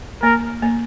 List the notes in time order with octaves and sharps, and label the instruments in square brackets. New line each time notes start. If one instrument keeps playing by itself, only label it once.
[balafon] A#3 [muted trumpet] A#4
[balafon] A#3